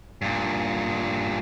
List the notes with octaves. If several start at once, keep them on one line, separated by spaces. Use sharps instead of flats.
G2 A#2